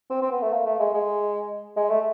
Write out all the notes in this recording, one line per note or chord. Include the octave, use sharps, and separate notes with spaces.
C4
C4
B3
A3
A#3
A3
G#3
G#3
G#3
A3